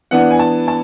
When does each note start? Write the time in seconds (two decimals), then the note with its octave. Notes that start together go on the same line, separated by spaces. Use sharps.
0.11 E3 B3 D4 F#5
0.31 G#5
0.39 A5
0.68 A5